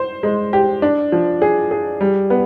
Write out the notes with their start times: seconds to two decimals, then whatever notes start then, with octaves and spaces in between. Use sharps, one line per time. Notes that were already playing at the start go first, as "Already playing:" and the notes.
Already playing: C5
0.23 G#3
0.53 G4
0.82 D4
1.12 F3
1.42 G#4
1.71 G#4
2.01 G3
2.30 B3